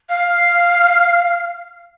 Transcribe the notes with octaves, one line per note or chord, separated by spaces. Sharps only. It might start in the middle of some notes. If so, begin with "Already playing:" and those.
F5